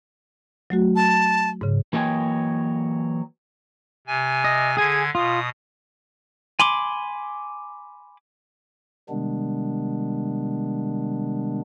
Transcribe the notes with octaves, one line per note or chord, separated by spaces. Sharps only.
F#3 A3 F#4
A5
G#2 C#3
E3 F#3 A#3 D#5 G5 G#5
C3 G#5
D#5
D3 G#4 G#5 G#6
B2 F4 D#6
G#5 B5 C6 D6
C3 D#3 G3 G#3 B3 D4